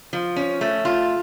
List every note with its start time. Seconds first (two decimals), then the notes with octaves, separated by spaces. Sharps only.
0.13 F3
0.36 C#4
0.61 A3
0.85 F4